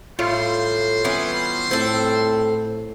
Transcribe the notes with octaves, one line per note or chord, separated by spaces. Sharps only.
A2 G3 F4 C5 C6
E3 B3 C#4
A2 C4 A4